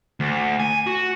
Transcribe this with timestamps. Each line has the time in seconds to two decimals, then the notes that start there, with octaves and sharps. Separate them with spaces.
0.20 D2
0.60 G#5
0.87 F#4